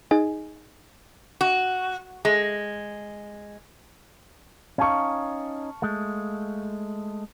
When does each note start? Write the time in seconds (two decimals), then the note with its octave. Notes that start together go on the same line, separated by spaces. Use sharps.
0.11 D#4 G#4 D#5 G#5
1.41 F#4
2.25 G#3
4.78 C#4 D#4 F5 A5 C#6
5.82 G#3 A3